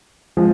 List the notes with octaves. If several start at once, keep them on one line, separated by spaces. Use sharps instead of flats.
F3 G#3